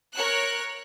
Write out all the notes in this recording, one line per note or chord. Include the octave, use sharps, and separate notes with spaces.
A#4 C#5 F#6